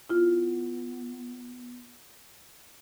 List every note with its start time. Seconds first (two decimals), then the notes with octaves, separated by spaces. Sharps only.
0.09 B3 E4 F4